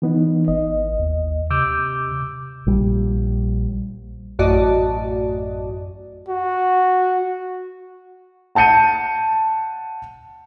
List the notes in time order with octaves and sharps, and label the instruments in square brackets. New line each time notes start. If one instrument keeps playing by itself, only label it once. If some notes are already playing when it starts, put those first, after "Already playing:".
[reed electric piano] E3 B3 D#4
[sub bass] G#1 [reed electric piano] D#5
[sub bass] D#2
[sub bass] C3 [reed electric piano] D6 E6 G6
[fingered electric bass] A#1 G3
[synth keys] A1 F#2 F#4 D5 D#5 A5
[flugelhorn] F#4
[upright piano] F#5 A5 G6 C#7 D#7